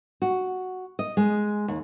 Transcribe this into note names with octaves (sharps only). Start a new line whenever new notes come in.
F#4
D#5
G#3
D#2